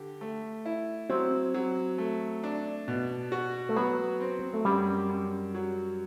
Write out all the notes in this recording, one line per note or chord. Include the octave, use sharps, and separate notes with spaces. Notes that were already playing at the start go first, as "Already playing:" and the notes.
Already playing: D3 G4
A3
E4
F#3 C4
F#3
A3
D4
B2
F#4
A3
F#3 B3
C4
A3
F#2 G3
F#2
F#3